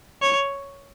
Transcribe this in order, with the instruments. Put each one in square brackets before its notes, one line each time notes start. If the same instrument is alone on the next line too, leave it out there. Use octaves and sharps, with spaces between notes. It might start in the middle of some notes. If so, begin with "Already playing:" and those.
[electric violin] C#5